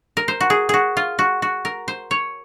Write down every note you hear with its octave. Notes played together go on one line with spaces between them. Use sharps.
A#4
C5
F#4
G#4
F#4 G#4
F4
F#4
F#4
A#4
C5
C#5